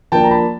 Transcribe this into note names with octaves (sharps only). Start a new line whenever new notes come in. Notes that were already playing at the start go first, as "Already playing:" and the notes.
F3 A#3 D4 G5 A5
A#5
A5 B5